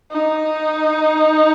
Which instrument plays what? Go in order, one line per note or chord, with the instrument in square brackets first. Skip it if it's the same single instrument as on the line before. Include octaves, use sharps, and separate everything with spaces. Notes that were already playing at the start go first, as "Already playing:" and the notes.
[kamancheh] D#4